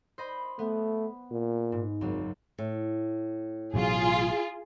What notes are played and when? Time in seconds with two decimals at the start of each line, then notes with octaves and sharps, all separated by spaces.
0.18 C5 D#5 B5
0.59 A3 B3
1.31 A#2
1.72 G#2
2.01 G#1 C#2 F#2 F#3
2.59 A2
3.74 A1 B2 F#3 F4 G#4